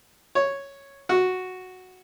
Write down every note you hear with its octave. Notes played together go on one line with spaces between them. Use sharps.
C#5
F#4